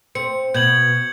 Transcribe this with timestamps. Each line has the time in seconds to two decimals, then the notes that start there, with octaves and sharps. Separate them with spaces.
0.15 C4 C#7
0.54 B2 G6 G#6 F#7